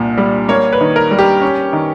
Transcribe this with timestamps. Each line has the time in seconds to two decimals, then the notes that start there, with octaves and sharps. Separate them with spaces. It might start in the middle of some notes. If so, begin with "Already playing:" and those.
Already playing: C2 A#2
0.18 G3
0.48 A#3 C#5
0.73 B4
0.81 D#3
0.96 A#4
1.11 G3
1.19 G4
1.42 C#4
1.73 D#3